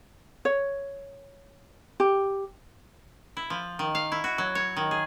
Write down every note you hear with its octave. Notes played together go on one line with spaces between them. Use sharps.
C#5
G4
E4
F3
D#3
F5
E4
F#4
F#3
C#5
D#3
G#4